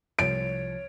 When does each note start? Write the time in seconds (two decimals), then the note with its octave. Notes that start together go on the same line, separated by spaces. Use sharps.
0.19 C2 F3 C#5 A6 D7